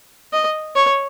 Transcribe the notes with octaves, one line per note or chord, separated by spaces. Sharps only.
D#5
C#5